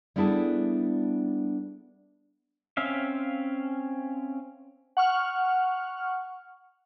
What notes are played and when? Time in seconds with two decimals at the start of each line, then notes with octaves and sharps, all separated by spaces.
0.16 G3 B3 D4 E4 G#4 A4
2.77 C4 C#4 E5 F5
4.97 F#5 C#6 F6